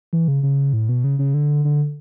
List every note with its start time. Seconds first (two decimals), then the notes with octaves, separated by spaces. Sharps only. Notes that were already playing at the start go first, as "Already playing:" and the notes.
0.13 E3
0.28 C#3
0.43 C#3
0.73 A2
0.89 B2
1.04 C#3
1.19 C#3
1.34 D3
1.65 D3